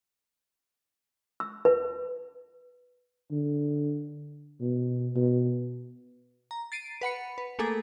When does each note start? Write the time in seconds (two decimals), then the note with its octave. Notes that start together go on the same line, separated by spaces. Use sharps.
1.40 E6
1.65 B4
3.32 D3
4.61 B2
5.15 B2
6.51 A#5
6.72 A6 C7 D7 D#7
7.01 B4 F#5 B5 C#7
7.38 B4
7.59 A3 A#3 G#4 A4 G#5 D6